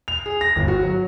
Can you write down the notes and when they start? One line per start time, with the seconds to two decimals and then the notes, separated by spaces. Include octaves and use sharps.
0.08 F7
0.26 G#4
0.41 A#6
0.56 G1
0.68 F#4
0.83 F#3